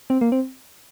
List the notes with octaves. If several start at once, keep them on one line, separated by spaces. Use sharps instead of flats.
C4
A#3
C4